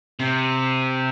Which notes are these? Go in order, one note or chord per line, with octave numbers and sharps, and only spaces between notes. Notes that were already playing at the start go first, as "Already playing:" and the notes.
C3